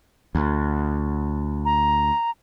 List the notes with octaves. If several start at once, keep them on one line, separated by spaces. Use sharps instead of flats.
D2
A#5